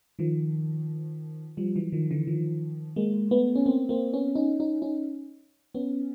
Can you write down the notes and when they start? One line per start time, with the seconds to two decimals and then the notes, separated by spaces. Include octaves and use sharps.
0.19 D#3 F3
1.57 F3 G3
1.76 E3 F#3
1.92 D#3 F3
2.11 D3 E3
2.27 D#3 F3
2.96 G#3 A#3
3.31 A3 B3
3.56 C#4
3.66 A#3 C4
3.89 A#3 C4
4.13 B3 C#4
4.35 C#4 D#4
4.60 C#4 D#4
4.82 C#4 D#4
5.74 B3 C#4